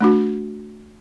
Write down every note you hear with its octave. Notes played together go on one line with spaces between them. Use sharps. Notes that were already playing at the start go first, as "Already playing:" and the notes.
A3 D4 F#4